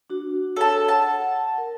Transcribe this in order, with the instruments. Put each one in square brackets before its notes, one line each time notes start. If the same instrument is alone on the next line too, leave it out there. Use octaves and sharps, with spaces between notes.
[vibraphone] D4 F#4
[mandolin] A4 A5 [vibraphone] C#5
[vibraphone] F#5 [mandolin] A5
[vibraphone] A#4